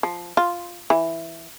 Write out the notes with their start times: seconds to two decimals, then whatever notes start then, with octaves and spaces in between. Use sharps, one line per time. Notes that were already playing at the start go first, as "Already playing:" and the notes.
0.03 F3
0.37 F4
0.90 E3